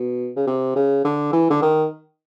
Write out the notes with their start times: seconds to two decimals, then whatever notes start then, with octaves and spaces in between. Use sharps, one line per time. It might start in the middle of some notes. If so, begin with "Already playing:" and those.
Already playing: B2
0.36 C#3
0.47 C3
0.76 C#3
1.04 D3
1.33 E3
1.50 D3
1.62 D#3